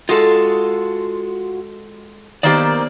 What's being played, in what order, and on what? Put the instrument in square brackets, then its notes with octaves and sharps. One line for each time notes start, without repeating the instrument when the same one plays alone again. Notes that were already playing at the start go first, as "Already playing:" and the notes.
[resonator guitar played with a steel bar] G#3 A4 [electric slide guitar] F4 F#4
[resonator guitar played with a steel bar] D#3 A#3 G4 [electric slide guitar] B3 C5 D5